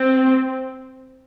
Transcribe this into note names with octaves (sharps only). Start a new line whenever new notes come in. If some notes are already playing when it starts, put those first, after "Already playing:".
Already playing: C4